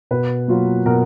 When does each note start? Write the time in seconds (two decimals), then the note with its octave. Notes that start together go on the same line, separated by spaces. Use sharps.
0.11 B2 B4
0.48 F#3 A#3 F4
0.86 B2 A#4